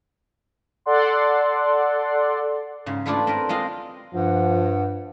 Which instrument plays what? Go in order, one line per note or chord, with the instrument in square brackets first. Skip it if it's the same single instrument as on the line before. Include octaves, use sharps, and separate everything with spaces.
[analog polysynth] A4 D5 F#5 C6
[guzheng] G#2 C#3
A3 D4 E4 F4 A4 B4
C4 A#4 B4
G#3 C4 F4 D#5
[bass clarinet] G2 [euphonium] F3 [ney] F#5